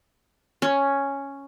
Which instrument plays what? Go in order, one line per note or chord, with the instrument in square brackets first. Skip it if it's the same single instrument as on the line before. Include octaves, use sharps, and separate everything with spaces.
[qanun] C#4